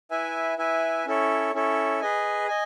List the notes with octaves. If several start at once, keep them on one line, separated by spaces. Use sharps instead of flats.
E4 B4 E5 G#5
E4 B4 E5 G#5
C#4 E4 A4 C#5
C#4 E4 A4 C#5
G#4 B4 D#5 G#5
D#5 G#5